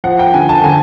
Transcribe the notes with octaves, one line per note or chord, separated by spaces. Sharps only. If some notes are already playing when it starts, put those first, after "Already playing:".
F3 F#5
G5
D3 G#5
A5
D3 G#5